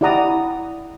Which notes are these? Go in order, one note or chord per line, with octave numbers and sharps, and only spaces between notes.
E4 G4 D5 F#5 A#5 D#6